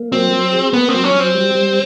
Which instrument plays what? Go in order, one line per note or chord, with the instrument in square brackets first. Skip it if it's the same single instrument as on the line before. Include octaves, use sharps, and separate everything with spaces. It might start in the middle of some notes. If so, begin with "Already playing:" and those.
Already playing: [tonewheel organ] A#3
[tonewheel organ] F#3 [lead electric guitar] C4
[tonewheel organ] F#3
G#4
[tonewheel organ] A#3 [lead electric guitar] B3
[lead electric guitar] C4
[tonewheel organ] F#3
[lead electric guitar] C#4
[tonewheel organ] F#3
[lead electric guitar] C4
[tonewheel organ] G3
G3